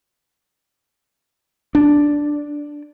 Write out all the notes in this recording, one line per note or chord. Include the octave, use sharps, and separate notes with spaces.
D4